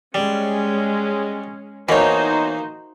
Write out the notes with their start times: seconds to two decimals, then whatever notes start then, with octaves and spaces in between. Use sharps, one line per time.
0.14 G3 G#3 C#4
1.89 B2 E3 A#3 D#4 F#4 C5 C#5